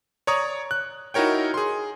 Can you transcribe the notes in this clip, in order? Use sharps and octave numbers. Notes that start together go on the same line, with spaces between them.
C#5 D5 A#5 C#6 D#6
F#6
D#4 E4 F#4 A#4 C#5 G5
G#4 C6